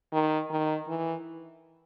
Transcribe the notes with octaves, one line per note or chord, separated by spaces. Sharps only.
D#3
D#3
E3